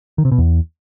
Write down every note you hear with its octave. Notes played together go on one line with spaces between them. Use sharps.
D#3
C3
B2
E2